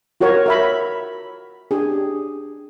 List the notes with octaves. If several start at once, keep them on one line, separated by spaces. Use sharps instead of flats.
F4 F#4 A#4 C#5
A#4 E5 B5
D4 G4 G#4